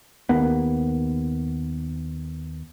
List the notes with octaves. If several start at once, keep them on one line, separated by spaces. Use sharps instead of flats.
D#2 A#3 B3